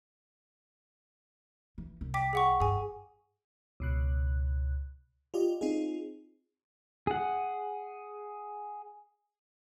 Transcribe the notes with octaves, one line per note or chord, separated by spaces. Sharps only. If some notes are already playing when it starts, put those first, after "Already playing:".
E3
C2
G5 D6 B6
G#4 F#5 C#6
G2 G#4 G#5
C#2 B2 F#6
F4 G4 D5 D#5
C4 D#4 F4 G#4
G#4 F#5